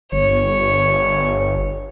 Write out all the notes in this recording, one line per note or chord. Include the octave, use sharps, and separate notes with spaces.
G1 C#5